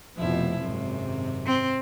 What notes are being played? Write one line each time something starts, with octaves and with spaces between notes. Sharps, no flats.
F1 F2 B2 F3 E4
G#1 F#2 C3
C4